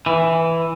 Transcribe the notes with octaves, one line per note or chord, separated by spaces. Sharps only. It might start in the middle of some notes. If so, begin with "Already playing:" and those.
E3